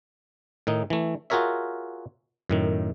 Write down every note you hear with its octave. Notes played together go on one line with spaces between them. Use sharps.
A2 D#3 D#4
E3 A3
F4 F#4 G#4 A#4 C#5 E5
F#2 A2 D#3